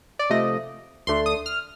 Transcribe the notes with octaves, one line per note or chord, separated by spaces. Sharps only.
D5
C3 F3 A3 D#5
D2 D3 A3 D4 C6
D#6
F6